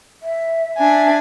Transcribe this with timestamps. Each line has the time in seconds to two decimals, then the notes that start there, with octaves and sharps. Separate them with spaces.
0.23 E5
0.78 D4 E5 G#5